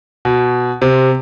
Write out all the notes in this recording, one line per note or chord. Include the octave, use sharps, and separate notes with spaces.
B2
C3